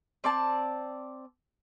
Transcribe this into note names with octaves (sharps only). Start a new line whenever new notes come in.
C4 D5 A5